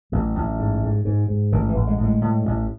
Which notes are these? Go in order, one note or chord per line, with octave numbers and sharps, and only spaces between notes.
A1 F#3
A1
G#2
G#2
G#2
G#2
A1 D#3
E3
A1
G#3
A2
G#3
A2
A1